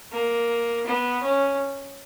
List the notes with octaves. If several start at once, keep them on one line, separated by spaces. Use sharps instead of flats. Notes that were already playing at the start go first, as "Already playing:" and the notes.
A#3
B3
C#4